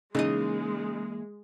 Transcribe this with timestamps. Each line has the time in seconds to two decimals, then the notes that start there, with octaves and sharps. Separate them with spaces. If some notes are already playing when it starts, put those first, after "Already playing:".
0.15 C#3 E3 G#3 A#3 D#4 D#5